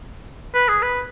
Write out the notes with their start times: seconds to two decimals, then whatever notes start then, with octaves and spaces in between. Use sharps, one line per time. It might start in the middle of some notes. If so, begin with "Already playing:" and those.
0.54 B4
0.68 G#4
0.82 B4